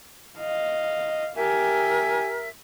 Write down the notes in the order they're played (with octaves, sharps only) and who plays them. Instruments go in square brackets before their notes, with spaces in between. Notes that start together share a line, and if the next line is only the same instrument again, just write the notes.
[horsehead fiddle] D#5 F5
[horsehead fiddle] G4 G#5 [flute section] A#4 E5